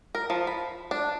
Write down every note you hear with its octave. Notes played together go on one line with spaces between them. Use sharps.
A#4
F3
B5
D4